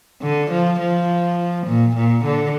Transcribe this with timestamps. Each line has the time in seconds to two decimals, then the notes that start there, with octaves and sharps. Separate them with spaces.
0.22 D3
0.51 F3
0.80 F3
1.67 A#2
1.96 A#2
2.25 D3